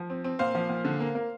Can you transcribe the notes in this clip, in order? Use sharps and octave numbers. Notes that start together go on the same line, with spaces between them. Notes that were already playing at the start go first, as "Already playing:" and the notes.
Already playing: F3
C4
C4
A#2 C5 F5
F3
A#2
D3
A#3
A#3